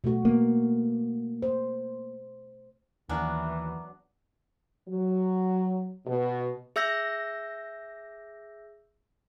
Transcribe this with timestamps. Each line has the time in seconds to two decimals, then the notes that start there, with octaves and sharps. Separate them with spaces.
0.04 B2 A3 F#4
0.25 A#3 B3
1.42 C5
3.09 D#2 E3 F#3 B3 D4 A#4 F#5 G#5
4.88 F#3
6.07 B2
6.76 G#4 E5 E6 G6 A#6